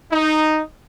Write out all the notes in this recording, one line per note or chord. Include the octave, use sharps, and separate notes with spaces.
D#4